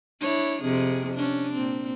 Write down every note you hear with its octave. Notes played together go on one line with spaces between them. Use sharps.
D4 E4 C#5
F2 C3 G#4
C#4 D4
A#2 C4